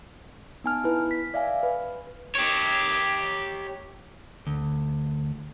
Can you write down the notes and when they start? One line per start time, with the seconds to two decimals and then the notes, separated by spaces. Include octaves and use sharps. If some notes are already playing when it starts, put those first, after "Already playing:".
0.64 B3 D#4 G#5 A5 F6
0.84 E4 B4
1.11 B6
1.34 D5 E5 F5 G#5
1.63 B4
2.35 G4 C#5
4.47 D2